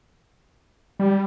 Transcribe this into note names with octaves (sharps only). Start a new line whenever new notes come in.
G3